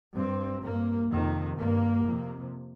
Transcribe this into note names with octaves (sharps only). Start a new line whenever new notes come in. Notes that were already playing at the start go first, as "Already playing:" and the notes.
G2 C4
G2 A#3
F2 C3 D#3
G2 A#3
F2 C3